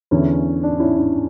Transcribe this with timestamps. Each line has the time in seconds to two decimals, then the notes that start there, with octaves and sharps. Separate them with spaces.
0.11 E2 D3 C#4 E4
0.63 D4
0.80 C#4 E4
0.97 D4